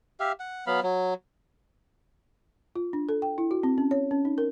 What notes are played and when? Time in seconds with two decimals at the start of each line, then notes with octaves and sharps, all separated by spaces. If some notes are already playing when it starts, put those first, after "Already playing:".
0.20 G4 E5 F5
0.40 F#5
0.67 F#3 B3 F5 B5
0.83 F#3
2.76 F4
2.93 D4
3.09 A4
3.22 G5
3.38 E4
3.51 F#4
3.63 C4
3.78 C#4
3.91 C#5
4.11 C#4
4.25 D#4
4.38 A#4